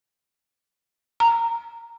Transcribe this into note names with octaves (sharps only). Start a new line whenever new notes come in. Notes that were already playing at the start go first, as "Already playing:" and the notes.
A#5